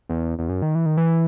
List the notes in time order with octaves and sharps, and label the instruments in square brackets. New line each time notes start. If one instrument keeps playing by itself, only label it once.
[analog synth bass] E2
E2
F#2
D#3
E3
D#3
E3